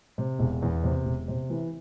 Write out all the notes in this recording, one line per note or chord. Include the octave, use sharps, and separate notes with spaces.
C3
E1
E2
C3
E1
C3
E3